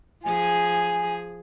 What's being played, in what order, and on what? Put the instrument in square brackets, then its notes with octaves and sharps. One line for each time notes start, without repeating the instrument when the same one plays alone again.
[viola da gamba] F3 G#4 [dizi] G#5